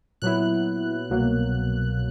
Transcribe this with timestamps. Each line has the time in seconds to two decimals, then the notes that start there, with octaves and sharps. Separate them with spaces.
0.22 A#2 F#3 B3 E4 F#6
1.10 C2 B2 F#3 A#3